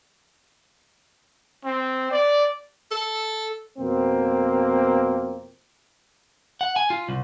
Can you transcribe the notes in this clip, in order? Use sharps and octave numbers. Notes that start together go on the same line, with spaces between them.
C4
D5
A4
F2 B2 A#3 C4
F#5
G#5
F4
C2